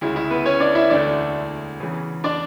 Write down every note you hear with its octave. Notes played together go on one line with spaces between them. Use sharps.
D2 C#3 G#3 E4
E4
B3 B4
C#4 C#5
D4 D5
E4 E5
E1 D2 D3 A3 D4 D5
E2 C#3 E3
D4 D5